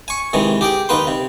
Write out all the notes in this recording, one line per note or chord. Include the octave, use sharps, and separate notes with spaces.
G#5 C#6
C3 D#3 E3 G#3
G4 G#4 G5
D#2 D#4 B4 C6
C3